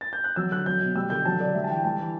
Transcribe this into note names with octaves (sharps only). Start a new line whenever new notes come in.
A6
G6
F#6
F#3 E6
D3 F#6
F#3 G6
B2
G3 E6
D3 G6
F#3 A5
D3 D5
G3 E5
A5
E3 G5
G3 A5
E3